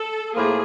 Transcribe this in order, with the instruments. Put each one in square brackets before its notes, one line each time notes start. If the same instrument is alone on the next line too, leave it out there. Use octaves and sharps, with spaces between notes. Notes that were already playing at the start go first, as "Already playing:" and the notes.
Already playing: [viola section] A4
[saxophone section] A2 F3 A#3 [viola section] G#4